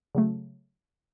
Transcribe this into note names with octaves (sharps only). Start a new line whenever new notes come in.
C#3 F#3 A3